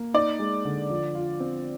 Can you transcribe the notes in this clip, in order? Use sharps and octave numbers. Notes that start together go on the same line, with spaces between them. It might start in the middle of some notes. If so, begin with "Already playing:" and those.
Already playing: A#3
D#4 D5
G#3
D3
F3
F4
C4